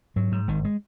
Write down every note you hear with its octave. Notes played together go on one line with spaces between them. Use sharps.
G#2 F#3
G#2
G#1 D#3
G#3